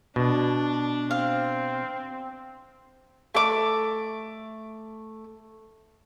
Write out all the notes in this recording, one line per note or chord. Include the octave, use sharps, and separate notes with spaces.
B2 D4
C4 F5
A3 D6